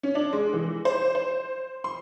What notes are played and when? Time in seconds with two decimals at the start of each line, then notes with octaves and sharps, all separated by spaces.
0.03 C#4
0.15 D4
0.33 G#3
0.53 E3
0.85 C5
1.15 C5
1.84 C6